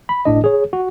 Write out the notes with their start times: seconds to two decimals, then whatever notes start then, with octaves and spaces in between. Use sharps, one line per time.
0.09 B5
0.25 G1 A2 D4 D#5
0.44 G#4 C#5
0.73 F#4